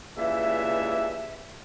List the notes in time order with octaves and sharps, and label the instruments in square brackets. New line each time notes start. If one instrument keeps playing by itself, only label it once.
[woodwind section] C#2 G2 E3 A#3 E5